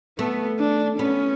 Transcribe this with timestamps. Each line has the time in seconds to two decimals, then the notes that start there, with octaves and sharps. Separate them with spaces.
0.19 A3 B3
0.59 D4
0.98 B3 C#4